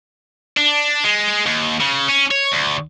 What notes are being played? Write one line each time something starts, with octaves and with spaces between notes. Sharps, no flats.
D4
G#3
D#2
C#3
C#4
C#5
D2